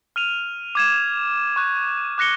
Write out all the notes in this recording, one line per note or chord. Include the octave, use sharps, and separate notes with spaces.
F6 D#7 F7
D6 G#6 E7
C#6 F#6
D6 F#6 A#6 C#7 G7